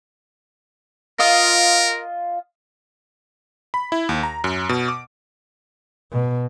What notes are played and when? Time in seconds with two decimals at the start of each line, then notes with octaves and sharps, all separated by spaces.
1.19 F4 A#4 D#5 F5
3.74 B5
3.92 E4
4.09 D#2
4.23 A#5
4.44 F#2
4.69 B2
4.88 D6
6.12 B2